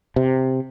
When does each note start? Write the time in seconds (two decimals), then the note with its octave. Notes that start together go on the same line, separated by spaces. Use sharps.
0.16 C3